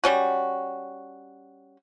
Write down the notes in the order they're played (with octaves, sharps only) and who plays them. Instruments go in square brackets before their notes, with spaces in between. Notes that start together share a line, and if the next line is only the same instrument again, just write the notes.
[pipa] G3 C#4 F#4